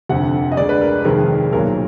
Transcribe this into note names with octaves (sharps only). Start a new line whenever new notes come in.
F1 F2 D3 F#5
D#5
D2 D3 G#3 D5
B4
A#4
F1 F2 D#3 G#3 A#4
B1 A#2 F#3 A#4